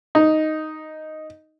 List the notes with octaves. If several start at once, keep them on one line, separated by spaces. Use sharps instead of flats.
D#4